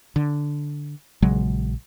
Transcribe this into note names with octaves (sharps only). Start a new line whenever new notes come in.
D3
A#1 C#3 F#3 G#3